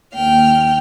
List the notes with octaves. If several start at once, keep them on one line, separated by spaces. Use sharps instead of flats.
D#2 G5 F6